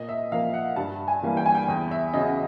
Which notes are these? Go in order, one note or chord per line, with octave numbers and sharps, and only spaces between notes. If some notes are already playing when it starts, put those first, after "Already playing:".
Already playing: A#2 D#5
E5
F3 A#3 F5
F#5
G2 A5
G#5
E3 G3 A#3
G5
G#5
G5
E2
E5
C#3 F#3 D#5